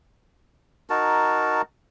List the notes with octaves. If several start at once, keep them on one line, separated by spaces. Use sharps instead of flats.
D#4 F#4 A#4 A5